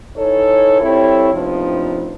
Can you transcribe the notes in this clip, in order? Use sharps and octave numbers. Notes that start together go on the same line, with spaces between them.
E3 D#4 A4 C#5
G3 C4 E4 A4 C#5
A2 C3 F3 B3 D4 D#4